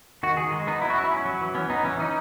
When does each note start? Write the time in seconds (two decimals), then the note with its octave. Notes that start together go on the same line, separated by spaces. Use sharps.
0.23 D#3 F#4
0.37 D#3 G#4
0.52 G#3
0.67 B3 D#4
0.82 F#3 E4
0.90 F#4
0.96 C#4 E4
1.11 C#4
1.25 F#3
1.41 E3
1.55 B3 C#4
1.70 B3 D#4
1.85 E3 C#4
1.99 E3 D#4